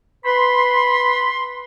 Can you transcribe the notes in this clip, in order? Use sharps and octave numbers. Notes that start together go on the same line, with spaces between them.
B4 B5 C6